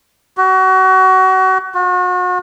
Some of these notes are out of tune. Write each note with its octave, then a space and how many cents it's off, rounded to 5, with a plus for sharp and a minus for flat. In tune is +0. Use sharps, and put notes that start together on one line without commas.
F#4 +30
F#4 -40